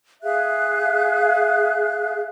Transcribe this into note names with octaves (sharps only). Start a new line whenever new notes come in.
G#4 E5 F5 F#6